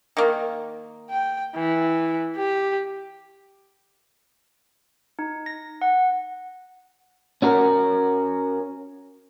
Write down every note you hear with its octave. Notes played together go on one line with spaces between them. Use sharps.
D#3 A#3
G5
E3
G4
D#4
A#6
F#5
C#4 F#4 A#4